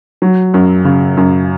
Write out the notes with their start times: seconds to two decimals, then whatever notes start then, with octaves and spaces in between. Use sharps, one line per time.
0.22 F#3
0.54 F#2
0.85 C#3
1.17 F#2